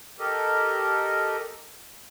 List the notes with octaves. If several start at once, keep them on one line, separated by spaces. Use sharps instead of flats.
G4 A4 A#4 D#5